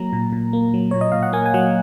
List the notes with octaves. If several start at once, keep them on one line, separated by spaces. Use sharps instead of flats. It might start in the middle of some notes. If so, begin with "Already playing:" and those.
Already playing: F#3 A#3 A#5
A#2
A#2
A#3
F#3
A#2 C#5
D#5
A#2 F5
F#5
A#3 G#5
G#5
F#3 F#5